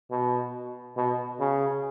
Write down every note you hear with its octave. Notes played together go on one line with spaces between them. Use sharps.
B2
B2
C#3